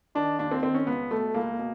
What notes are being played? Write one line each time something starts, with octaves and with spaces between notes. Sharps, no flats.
D#3 D4
D#2 D4
C4
D#3 C4
C#4
C#2 B3
B2 A3
C#2 A#3
B2